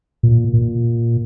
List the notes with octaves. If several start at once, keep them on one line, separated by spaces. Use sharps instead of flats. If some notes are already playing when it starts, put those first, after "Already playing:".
A#2
A#2